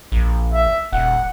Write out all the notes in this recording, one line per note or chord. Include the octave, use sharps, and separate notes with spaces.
A#1
E5
D#1 F#5